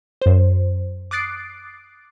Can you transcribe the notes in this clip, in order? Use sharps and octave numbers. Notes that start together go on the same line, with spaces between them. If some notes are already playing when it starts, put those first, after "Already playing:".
F#2 C5
D6 D#6 F#6 A6 C7 D7